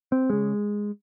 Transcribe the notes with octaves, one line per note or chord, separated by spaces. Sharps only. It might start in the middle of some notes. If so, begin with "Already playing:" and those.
C4
C#3 G#3